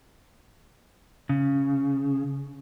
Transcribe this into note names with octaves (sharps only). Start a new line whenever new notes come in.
C#3